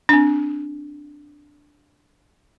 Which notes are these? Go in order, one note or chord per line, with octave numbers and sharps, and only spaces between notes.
C4 D4